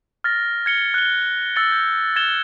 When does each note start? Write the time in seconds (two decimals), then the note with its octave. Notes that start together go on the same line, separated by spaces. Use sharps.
0.24 F6 A6 A#6
0.66 G#6 C#7 G7
0.94 F#6 G7
1.56 E6 A6 C#7
1.72 G6
2.16 G#6 A6 E7 G7